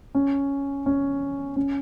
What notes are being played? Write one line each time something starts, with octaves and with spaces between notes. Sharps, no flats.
C#4
C#4
C#4